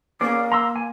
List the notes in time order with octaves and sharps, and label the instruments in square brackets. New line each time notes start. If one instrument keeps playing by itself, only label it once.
[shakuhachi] A#3 [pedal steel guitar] C#4 G#4 D5
[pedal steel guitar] A#5 C6 E6
G#5